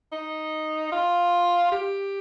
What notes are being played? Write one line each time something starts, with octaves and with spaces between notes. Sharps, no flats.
D#4
F4
G4